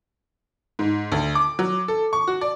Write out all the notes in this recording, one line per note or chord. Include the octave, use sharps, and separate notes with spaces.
G#2
D2
D6
F#3
A4
C#6
F#4
D5